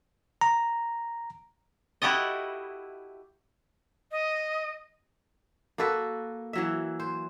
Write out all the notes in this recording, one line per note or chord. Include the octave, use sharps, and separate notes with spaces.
A#5
E4 F#4 G4 A4 D#5
D#5
A#3 F#4 A4 B4
E3 F#3 E5
C5